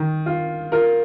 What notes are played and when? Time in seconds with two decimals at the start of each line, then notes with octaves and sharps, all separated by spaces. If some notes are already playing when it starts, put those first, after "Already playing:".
Already playing: D#3
0.26 F4
0.72 F4 A#4